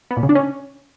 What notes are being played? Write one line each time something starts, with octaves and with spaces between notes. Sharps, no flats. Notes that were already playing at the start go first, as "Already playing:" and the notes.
B3
A#2
C#3
D4
C#4